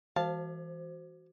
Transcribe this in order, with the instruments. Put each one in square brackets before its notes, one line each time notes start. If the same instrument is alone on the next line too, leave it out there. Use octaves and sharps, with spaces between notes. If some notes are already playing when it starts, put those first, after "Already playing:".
[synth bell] E3 F#4 C5 [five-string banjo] F5 A5